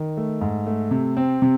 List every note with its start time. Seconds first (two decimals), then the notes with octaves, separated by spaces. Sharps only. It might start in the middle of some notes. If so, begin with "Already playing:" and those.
Already playing: D#3
0.17 A3
0.41 G#2
0.66 A3
0.91 C3
1.17 C4
1.42 C3